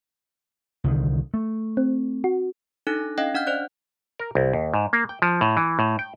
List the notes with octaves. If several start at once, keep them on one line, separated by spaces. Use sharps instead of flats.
C2 D3 D#3
A3
C4
F#4
D4 D#4 A4 F#6 A#6
C#4 D#5 F5 G5
D4 F#5 F6 G6
C5 D5 F#6
A#4
C2
D#2
G#2
A#3
G5
F3
A2
E3
A2
G5